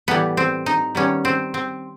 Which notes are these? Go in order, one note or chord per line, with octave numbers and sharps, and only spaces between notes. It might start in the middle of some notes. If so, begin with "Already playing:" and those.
A2 E3 G3 B3
C4
D#4
D#3 G3 B3 C#4
C4
C4